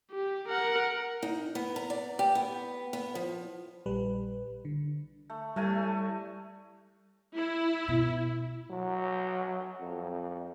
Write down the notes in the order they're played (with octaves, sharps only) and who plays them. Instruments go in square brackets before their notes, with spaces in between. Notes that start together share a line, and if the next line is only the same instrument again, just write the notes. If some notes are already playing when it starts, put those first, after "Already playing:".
[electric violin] G4
A#4 F#5
[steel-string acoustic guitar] D#4
B3
A#5
D5
G4
B3
B3
F3
[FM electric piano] A#1 G3 B4
D3
[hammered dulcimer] A3
[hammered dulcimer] A2 A3 G#5 [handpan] G3
[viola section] E4
[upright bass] B2
[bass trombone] F#3
F2